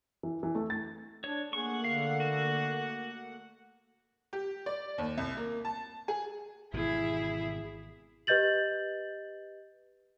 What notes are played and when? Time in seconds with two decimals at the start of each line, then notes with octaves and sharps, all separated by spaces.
0.23 E3
0.43 E3
0.55 A3
0.70 A6
1.24 D4 C#5
1.53 A3 A#3 G#4 F#5 C#6
1.84 D3 F5
2.20 F#4
4.33 G4
4.66 D5
4.98 D#2
5.17 C2
5.37 A#3
5.65 A5
6.08 G#4
6.73 G#1 B2 E3 E4 G#4
8.27 G4 B4 D#5 G6 A6 F#7